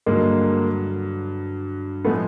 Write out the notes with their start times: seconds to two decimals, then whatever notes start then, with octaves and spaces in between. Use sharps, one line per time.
0.06 G2 D3 F#3 G#3 A#3
2.04 A2 F3 G#3 A3 B3